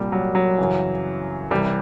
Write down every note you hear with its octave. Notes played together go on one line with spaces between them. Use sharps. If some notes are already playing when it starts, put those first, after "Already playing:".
Already playing: C2 A#2 G3
F#3
F#3
F#2 C#3 E3
C2 C3 E3 G3